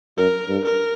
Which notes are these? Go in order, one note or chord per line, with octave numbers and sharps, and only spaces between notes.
F#2 A#4
G2
A#4